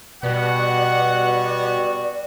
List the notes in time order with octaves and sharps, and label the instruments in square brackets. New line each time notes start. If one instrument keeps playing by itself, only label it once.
[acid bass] B2 [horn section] G3 B3 F#4 [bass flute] D5 [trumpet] F#5